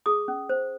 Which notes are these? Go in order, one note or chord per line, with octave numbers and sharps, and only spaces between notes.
G#4 D#6
C#4
C5